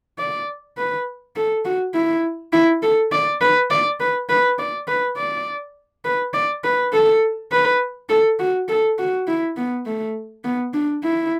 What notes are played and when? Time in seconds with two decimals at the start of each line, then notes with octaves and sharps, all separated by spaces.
0.18 D5
0.77 B4
1.36 A4
1.65 F#4
1.95 E4
2.53 E4
2.83 A4
3.12 D5
3.41 B4
3.70 D5
4.00 B4
4.29 B4
4.58 D5
4.88 B4
5.17 D5
6.05 B4
6.34 D5
6.64 B4
6.93 A4
7.52 B4
8.09 A4
8.39 F#4
8.68 A4
8.98 F#4
9.27 E4
9.56 B3
9.86 A3
10.44 B3
10.74 D4
11.03 E4